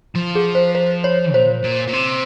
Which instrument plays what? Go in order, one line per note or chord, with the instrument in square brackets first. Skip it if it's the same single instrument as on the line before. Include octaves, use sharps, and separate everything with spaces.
[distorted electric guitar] F3
[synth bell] G#4
C5
C5
C#5
[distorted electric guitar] A#2 [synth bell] C5
[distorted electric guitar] A#2
A#2
C3